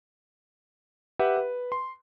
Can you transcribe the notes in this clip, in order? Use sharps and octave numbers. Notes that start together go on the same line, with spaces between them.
G4 B4 E5 F#5
B4
C6